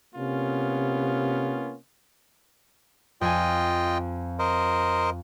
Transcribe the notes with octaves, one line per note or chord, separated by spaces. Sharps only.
C3 A#3 B3 C#4 F4
F2 F4 D#5 G5 G#5
A#4 C5 D#5